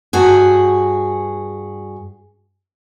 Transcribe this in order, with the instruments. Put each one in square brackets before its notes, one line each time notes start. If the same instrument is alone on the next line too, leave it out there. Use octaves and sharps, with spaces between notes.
[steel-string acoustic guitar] G2 F#4 G#4